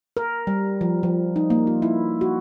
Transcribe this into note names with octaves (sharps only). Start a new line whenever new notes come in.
A#4
G3
F3
F3
D#4
A#3
F4
E4
F#4